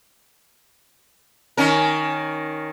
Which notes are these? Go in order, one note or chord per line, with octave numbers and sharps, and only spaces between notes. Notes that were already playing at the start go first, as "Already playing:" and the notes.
D#3 C#4 A#4